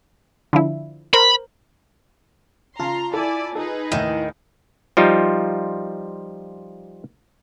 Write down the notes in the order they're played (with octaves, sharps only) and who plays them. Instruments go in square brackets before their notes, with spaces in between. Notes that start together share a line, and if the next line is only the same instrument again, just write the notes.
[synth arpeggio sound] D3 F3 E4
[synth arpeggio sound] A#4 C5 [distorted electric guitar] B5
[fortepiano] C#3 [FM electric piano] F4 A5 [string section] A#5 C6
[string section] E4 D5 G#5 [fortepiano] A4
[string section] D#4 G#4 B4 [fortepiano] A4
[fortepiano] D#2 A2 [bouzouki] D#3 [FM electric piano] E4
[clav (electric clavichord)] F3 G3 D#4 F4